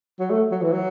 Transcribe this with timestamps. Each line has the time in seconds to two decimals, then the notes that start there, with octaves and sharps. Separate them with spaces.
0.19 F#3
0.30 A3
0.51 F#3
0.62 E3
0.72 F#3